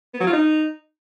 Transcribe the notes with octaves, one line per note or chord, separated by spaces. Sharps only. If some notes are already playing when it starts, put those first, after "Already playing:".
B3
F#3
F4
D#4